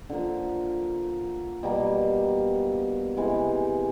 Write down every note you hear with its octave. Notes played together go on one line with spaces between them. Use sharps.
D3 F3 A#3
B2 G3 A#3
C3 E3 G#3 B3